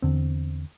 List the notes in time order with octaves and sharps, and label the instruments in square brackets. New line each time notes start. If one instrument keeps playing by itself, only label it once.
[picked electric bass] E2 D3 C4